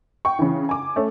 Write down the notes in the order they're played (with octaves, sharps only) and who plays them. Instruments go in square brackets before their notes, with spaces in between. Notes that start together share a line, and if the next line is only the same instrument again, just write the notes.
[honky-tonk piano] G5 C#6
C#3 E3
G#5 D6
A3 C#4